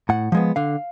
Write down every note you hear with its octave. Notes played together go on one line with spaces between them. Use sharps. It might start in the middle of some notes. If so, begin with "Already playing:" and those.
A2 F#5
F3 G#3 B3
D3 F5